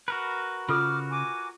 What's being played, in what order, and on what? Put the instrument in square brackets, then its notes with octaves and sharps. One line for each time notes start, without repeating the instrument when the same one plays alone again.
[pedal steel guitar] F#4 A#4 B4
[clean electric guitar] C#3 [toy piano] F4 A4 [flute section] D6 F6
[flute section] G#5 D6